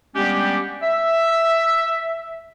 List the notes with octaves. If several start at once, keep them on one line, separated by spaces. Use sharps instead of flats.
G3 G#3 B3 C#4 D4 G4
E5